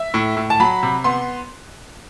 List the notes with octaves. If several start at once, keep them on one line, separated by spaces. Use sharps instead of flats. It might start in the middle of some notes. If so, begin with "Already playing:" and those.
Already playing: E5
A2
A2
A5
F#3 B5
C3
B3 C6